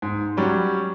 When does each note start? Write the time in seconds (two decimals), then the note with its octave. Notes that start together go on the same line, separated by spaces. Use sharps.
0.02 G#2
0.37 F#3 G3 C#4